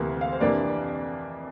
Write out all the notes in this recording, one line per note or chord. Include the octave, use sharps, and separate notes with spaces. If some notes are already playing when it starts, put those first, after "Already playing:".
Already playing: D2 C3 E3 A#3
F5
C5
F2 C3 E3 A#3 D4 D5